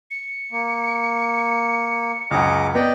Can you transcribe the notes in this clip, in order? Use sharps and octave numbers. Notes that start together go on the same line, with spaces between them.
C#7
A#3
C#2 F#2 G#4 D#5 D6
B3 D5 D#5 G5